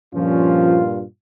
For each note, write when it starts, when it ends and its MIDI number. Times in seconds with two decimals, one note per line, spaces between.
0.15 1.04 43
0.15 1.04 46
0.15 0.82 53
0.15 0.82 61
0.15 1.04 65